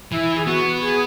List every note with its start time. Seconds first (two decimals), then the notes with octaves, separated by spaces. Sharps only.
0.12 E3 E4
0.37 G#4
0.46 B3 F#4
0.81 G#4